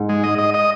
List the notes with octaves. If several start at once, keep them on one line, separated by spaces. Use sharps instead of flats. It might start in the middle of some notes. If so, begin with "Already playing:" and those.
Already playing: G#2
G#3
D#5
D#5
D#5